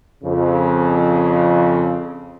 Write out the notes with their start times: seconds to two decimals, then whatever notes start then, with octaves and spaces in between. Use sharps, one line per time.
0.24 F2 C#3